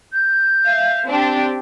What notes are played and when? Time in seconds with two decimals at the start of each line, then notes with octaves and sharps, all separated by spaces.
0.13 G6
0.66 E5 F5
1.06 C4 D4 G4